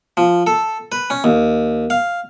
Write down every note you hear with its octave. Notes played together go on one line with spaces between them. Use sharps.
F3
A4
B4
C#4
D#2
F5